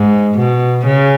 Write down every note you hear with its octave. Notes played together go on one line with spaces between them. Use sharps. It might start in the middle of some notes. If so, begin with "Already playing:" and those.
Already playing: G#2
B2
C#3